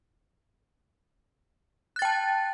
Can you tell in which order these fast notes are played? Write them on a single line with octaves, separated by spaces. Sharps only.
F#6 A6 G5 A5